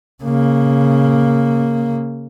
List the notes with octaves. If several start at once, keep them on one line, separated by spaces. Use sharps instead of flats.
C#3 A#3